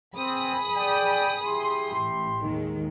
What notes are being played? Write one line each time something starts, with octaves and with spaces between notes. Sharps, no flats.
C4 G#4 B5 D#6
D5 G5
E4 G4 C6
A1
D#2 D#3 G#3